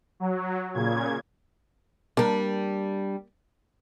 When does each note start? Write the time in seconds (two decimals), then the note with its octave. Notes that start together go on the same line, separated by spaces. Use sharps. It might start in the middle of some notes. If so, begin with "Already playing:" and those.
0.20 F#3
0.74 A#2 C#3 G#6
2.17 G3 A#3 D4 A#4